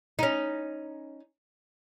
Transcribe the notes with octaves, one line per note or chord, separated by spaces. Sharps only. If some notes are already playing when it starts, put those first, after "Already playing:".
C#4 D#4